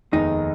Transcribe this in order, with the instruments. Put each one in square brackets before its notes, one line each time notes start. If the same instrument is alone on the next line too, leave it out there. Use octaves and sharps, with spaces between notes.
[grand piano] F1 D#2 D#3 G#3 B3 [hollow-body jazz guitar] D#4